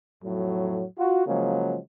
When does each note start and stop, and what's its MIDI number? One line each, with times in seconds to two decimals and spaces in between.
0.24 0.84 41
0.24 0.84 45
0.24 0.84 54
0.98 1.22 65
0.98 1.22 66
1.26 1.78 49
1.26 1.78 53
1.26 1.78 54
1.26 1.78 56
1.26 1.78 58